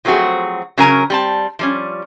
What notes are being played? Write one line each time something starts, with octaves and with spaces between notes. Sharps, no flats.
F3 F#3 A3 C4 F#4 G#4
C#3 F#3 C#4 A#4 G#5 A#5
G3 C4 A5
F3 G3 C#4